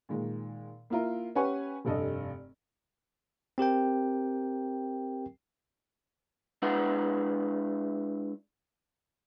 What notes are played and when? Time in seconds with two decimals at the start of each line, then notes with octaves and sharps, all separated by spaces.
0.09 A#2 D#3 G#3
0.90 A#3 E4 F4 A#4
1.36 C#4 G4 B4 F#5 G#5 C#6
1.85 F1 G2 A4 D#5
3.58 C4 G4 A#4 G5
6.62 G#3 D4 E4 B4 F#5